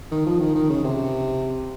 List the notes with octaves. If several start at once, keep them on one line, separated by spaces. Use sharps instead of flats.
D#3
F3
D#3
D#3
C#3
C3